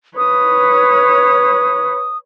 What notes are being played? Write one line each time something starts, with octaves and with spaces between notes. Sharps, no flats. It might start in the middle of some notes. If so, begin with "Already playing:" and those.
B4 C#5 D#6